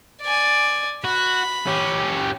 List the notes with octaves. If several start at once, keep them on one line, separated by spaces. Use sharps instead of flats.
D5 G#5
F#4 B5
C#4 G4